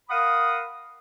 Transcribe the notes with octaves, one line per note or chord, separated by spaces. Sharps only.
A#4 F5 F#5 B5 D#6